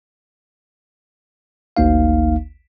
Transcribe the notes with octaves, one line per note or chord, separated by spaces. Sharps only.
G#1 D2 A#3 D#4 F5